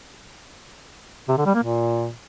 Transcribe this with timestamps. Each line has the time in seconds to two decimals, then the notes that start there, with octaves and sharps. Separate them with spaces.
1.28 C3
1.37 D3
1.46 G3
1.55 A#3
1.63 A#2